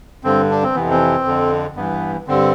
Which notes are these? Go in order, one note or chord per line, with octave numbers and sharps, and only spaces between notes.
G2 D3 C4
D4
C4
F2 C3 E3 B3
C4
F2 D3
G2 E3 B3
G2 D3 C4